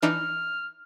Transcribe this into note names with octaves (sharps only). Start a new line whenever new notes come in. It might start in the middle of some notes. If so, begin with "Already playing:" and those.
E3 D4 D#4 F6